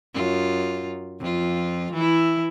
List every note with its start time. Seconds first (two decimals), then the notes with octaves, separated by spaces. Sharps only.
0.14 F#2 F4
1.20 F2 F4
1.94 E3 E4